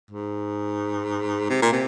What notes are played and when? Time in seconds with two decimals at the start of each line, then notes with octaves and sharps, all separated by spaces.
0.11 G#2
1.50 C3
1.62 A#2
1.73 C3